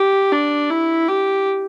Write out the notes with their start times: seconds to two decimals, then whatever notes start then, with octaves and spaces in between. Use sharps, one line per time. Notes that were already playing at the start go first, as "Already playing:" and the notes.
Already playing: G4
0.32 D4
0.70 E4
1.08 G4